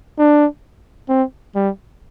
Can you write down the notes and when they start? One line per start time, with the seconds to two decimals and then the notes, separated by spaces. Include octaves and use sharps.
0.18 D4
1.09 C4
1.55 G3